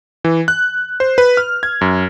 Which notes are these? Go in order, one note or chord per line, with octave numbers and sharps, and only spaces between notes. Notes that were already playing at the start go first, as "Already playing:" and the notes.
E3
F#6
C5
B4
F6
G#6
F#2